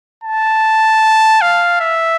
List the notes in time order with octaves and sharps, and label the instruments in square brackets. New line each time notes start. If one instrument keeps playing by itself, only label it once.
[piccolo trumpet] A5
F5
E5